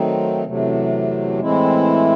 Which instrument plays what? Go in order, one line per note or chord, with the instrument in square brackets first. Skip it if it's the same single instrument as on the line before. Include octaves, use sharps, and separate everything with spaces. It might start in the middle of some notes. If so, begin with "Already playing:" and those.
Already playing: [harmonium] D#3 F#3 A3 C4 D#4
E2 C3 F#3 A3
A2 E3 G#3 C4 E4